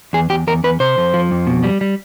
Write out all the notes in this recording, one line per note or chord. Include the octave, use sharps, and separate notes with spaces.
E2 G#4
E2 G4
E2 A#4
E2 B4
C3 C5
F2
F3
F2
B2
G3
G3